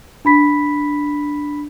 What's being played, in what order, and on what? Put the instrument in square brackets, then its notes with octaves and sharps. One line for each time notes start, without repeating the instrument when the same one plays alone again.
[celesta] D4 B5 B6